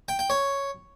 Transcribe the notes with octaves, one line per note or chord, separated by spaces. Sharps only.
G5
G5
C#5